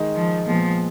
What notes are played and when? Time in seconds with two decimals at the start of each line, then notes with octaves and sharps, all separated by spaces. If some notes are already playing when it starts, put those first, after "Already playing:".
Already playing: D#3 G#3 D#4
0.16 F3
0.46 A#2 F3 G#3 B3